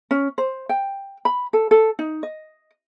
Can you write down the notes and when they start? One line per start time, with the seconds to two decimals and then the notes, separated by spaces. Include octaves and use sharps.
0.11 C#4
0.38 C5
0.69 G5
1.25 B5
1.53 A4
1.71 A4
1.99 D#4
2.23 D#5